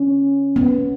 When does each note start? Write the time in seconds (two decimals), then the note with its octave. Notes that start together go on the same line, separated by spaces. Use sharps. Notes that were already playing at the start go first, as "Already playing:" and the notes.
Already playing: C#4
0.56 B3